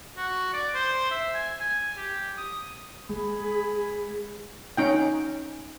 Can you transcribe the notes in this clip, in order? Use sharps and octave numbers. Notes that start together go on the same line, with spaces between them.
F#4
D5
C5
E5
G#5
G#5
G4
D#6
G#3 G#4 G#5 B5
C#4 D#4 G5